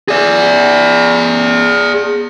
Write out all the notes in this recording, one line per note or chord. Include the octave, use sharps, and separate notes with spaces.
G#4 D5